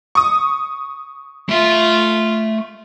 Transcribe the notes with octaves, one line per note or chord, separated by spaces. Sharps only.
C#6 D#6
A3 F4 E5